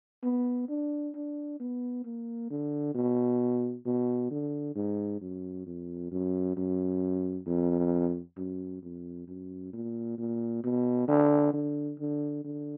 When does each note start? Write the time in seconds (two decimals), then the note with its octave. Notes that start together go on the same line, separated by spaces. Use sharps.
0.23 B3
0.69 D4
1.15 D4
1.60 B3
2.05 A#3
2.50 D3
2.95 B2
3.86 B2
4.31 D3
4.76 G#2
5.21 F#2
5.67 F2
6.11 F#2
6.57 F#2
7.47 F2
8.37 F#2
8.83 F2
9.28 F#2
9.73 A#2
10.18 A#2
10.64 B2
11.08 D3
11.53 D3
11.99 D3
12.44 D3